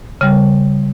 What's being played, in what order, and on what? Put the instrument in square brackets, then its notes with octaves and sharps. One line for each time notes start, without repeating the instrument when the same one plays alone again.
[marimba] C#3 G3